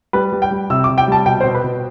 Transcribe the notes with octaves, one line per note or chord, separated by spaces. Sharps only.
G3 B4
G3
G5
G3
C3 E6
D6
C3
G5
G3 A5
B2 G5
C5
B2
B4
B2